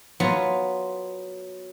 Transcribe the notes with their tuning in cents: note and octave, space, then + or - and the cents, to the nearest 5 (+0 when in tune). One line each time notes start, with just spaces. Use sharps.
F#3 +0 B3 +0 F4 +0